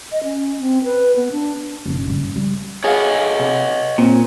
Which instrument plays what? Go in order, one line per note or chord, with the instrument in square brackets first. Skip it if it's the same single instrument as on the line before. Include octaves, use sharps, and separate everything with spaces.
[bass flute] D#5
C#4
C4
B4
B3
D4
[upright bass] F#1 B1
G2 C#3
G3
[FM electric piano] G#4 F5 [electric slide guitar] C#5 D#5 F#5
[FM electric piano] C3
[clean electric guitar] A#2 [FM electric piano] C4